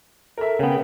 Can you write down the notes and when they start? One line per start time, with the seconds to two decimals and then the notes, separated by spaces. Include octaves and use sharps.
0.38 A4 A#4 E5
0.59 C#3 B3 G5